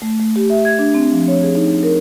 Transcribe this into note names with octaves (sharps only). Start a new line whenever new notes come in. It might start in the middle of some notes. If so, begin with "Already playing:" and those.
A3
A3
G4
E5
G#6
D4
C4
F3
C#5
G#4
D#4
A#4